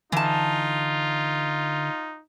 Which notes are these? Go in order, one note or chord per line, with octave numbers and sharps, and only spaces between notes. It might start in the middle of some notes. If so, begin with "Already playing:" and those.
D3 E3 D#4 F4 A5